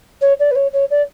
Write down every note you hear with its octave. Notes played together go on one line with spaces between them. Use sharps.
C#5
D5
B4
C#5
C#5
D5